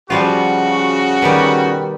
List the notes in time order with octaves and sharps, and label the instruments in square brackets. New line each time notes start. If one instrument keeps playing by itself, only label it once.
[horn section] C#3 F#4 [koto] F3 G3 F4
[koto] B2 D#3 G3